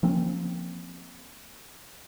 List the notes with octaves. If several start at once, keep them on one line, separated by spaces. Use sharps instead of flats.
F3 A#3 C4 C#4